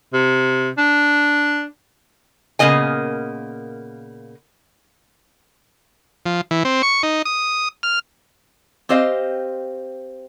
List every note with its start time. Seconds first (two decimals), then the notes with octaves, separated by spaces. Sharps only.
0.13 C3
0.78 D4
2.59 A#2 C#3 A#3 B3 D#5 G#5
6.26 F3
6.51 E3
6.65 C4
6.83 C#6
7.03 D#4
7.25 D#6
7.83 F6
8.89 C4 G4 C5 D#5 F5